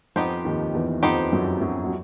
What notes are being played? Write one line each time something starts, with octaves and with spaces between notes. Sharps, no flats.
F2 F3 B3 D#4 G4 C5
D#2 D#3
E2 E3
F2 F3 B3 D#4 G4 C5
F#2 F#3
F#2 F#3
F#3